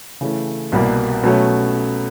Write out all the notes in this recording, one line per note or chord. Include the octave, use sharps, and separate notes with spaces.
C#3 E3 A3
C2 B2 G3 A#3
B2 F#3 A3 C#4